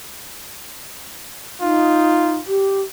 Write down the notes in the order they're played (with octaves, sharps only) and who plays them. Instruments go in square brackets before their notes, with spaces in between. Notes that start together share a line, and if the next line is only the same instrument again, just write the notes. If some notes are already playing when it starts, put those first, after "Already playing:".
[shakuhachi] D#4 [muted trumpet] F4
[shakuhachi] G4